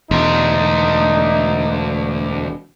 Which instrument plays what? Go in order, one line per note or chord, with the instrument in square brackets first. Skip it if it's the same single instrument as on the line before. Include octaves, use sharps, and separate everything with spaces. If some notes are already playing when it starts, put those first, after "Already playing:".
[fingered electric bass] E1 [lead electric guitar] D2 [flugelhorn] D#4